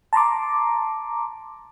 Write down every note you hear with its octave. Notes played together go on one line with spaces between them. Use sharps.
A5 A#5 C6 D6